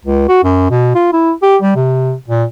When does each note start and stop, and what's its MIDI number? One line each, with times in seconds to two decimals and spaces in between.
0.05 0.28 37
0.28 0.43 66
0.43 0.67 42
0.70 0.92 47
0.95 1.10 65
1.13 1.32 64
1.42 1.56 67
1.62 1.74 55
1.75 2.14 48
2.28 2.44 46